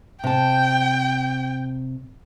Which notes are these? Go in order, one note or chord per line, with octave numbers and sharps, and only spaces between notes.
C3 G5 A5